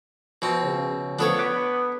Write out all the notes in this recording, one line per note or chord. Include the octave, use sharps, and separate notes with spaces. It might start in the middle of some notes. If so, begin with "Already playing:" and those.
B2 F3 C4
C#3
D2 F3 B3 D4 A4 B4 C#5
B4 F#5 D6